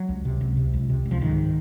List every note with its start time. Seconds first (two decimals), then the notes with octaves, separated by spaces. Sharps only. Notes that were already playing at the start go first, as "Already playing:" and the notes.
Already playing: F#3
0.09 C#2
0.25 C3
0.41 C#2
0.57 C3
0.74 C#2
0.89 C3
1.06 C#2
1.11 F3
1.21 G#2 D#3